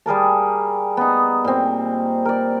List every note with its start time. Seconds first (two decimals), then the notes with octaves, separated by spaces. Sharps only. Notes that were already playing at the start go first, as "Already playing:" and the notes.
0.06 G3 G#4 A#4 A5
0.97 B3 D#4
1.44 A#2 C4
2.25 A#4 D5